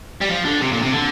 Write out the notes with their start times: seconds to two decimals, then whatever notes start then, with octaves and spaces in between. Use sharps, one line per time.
0.21 G3
0.30 F3
0.45 D3
0.61 C3
0.72 A#2
0.82 C3
0.93 D3